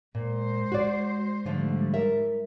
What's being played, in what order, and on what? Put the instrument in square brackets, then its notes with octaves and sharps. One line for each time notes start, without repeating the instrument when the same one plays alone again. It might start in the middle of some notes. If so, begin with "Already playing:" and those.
[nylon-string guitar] A#2 [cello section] G#3 C5
[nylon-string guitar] F#4 D5
[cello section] G#2 G3 [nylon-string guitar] D3 F3 A3
[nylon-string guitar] A#4 E5